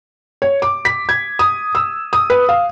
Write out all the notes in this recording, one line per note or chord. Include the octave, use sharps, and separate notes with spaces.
C#5
D6
B6
G#6
D#6
E6
D#6
B4
F5